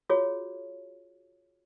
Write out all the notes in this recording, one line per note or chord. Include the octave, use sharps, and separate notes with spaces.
F4 F#4 G#4 C#5